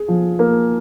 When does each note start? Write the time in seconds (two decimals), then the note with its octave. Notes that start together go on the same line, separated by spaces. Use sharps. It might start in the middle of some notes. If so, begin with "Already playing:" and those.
Already playing: G#4
0.08 F3
0.39 A#3